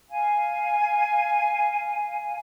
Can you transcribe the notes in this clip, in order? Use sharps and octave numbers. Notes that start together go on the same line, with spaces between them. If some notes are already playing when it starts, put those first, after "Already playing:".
F5 G#5